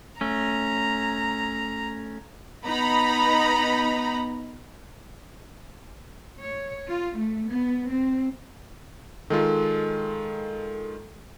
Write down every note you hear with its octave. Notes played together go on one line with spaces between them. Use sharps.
A3 C#4 A#5
B3 D#4 A#5 B5
C#5
F4
A3
B3
C4
D#3 G#3 F4 A4